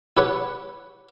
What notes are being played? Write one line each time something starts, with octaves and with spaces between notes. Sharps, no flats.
E4 G4 B4 C#5 F#5